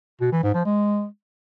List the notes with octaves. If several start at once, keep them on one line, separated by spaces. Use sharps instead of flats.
B2
E3
G#2
F3
G#3